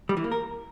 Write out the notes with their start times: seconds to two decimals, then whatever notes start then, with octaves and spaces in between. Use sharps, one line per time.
0.09 G3
0.17 E3
0.24 A#3
0.32 A#4